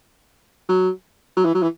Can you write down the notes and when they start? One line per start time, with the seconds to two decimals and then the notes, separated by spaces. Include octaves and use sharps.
0.69 F#3
1.37 F#3
1.45 E3
1.54 F#3
1.62 E3